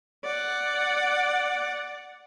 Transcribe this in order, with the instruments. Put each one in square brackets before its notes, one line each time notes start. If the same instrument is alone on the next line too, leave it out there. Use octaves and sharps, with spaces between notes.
[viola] D5 F#5